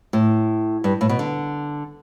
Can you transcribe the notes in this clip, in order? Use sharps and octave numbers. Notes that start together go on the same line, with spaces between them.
A2
G2
A2
B2
D3